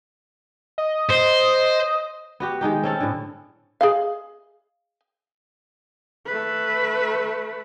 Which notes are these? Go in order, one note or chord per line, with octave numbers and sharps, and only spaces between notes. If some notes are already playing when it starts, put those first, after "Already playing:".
D#5
C5
B3 F#4 G4
D#3 G#3 D#4 G4
C4 C#4 A4
A2 D3
G#4 D#5 F5
A3 B4